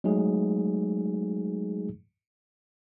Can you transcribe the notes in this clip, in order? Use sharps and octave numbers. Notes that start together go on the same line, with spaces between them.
F#3 G#3 A3 D#4 G#4